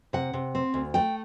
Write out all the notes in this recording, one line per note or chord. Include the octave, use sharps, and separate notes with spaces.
C3 F#5
C3
C4
D2
A3 G5